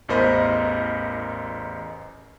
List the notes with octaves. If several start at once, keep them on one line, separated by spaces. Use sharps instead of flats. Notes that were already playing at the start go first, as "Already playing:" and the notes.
A1 E2 A#4 C5 D#5 B5